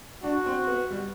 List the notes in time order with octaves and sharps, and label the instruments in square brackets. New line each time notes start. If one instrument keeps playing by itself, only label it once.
[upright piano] D4 [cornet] F#4
[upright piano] C4
B3
G3